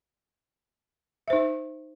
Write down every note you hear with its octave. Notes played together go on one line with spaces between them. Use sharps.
D#4 C5 E5